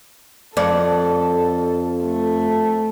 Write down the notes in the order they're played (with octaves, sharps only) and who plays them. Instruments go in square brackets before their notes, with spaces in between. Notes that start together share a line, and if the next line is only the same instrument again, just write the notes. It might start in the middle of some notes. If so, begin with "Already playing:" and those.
[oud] F2 D5 [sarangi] A4
[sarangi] A3